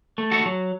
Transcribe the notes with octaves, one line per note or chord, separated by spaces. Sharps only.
A3
F#4 A4
F#3